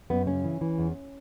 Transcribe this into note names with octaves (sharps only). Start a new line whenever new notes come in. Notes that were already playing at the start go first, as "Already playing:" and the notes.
F#2 B3
C#3 C#4
E3
E3
E2